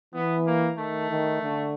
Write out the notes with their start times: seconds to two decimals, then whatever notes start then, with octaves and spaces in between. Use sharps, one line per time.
0.14 E3 B3
0.46 A#3
0.78 D#3 A3
1.11 D#3
1.42 D3